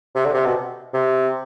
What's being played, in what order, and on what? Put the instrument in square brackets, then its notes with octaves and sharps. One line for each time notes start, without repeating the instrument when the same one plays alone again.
[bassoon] C3
D3
C3
B2
C3